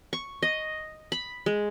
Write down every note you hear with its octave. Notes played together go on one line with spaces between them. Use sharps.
C#6
D#5
B5
G#3